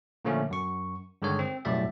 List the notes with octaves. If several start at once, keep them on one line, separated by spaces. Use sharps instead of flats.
A#2 D3 F3 A3 A#3 C#4
F#2 C#6
G2 D3 D#3 G#3 C#5
C4
B1 F#2 A2 G3 D5 E5